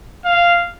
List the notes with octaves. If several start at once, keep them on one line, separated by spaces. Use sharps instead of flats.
F5